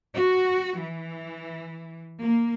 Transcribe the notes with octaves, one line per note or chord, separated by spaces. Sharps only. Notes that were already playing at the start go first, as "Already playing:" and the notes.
F#4
E3
A#3